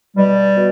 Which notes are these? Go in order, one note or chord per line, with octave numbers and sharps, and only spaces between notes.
B2 G3
B2